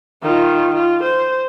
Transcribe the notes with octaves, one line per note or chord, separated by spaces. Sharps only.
D#3 F4
F4
C5